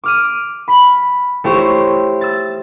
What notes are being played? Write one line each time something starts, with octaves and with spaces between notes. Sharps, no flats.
D6 F6 D#7
B5
A3 E4 G4 C5 C#5
E6 A6